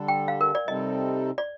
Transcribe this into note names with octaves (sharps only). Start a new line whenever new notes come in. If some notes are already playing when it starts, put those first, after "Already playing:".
Already playing: D3 G3 D4 A4
G5
F5
A#4
D5
C3 G3 C4 D#4 A4 D#5
D5